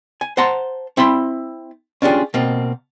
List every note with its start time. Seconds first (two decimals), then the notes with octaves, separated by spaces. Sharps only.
0.21 G#5
0.37 C5 F#5 A5 A#5 C6
0.97 C4 E4 B5 C6
2.02 C#4 D4 F4 G4 G#4
2.34 B2 A#3 C4